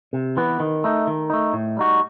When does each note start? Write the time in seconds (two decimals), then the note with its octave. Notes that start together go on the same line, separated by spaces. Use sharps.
0.13 C3
0.37 E3 B3
0.60 D#3
0.84 A3 D#4
1.07 D#3
1.30 A3 D#4
1.53 A2
1.77 G3 D#4 F#4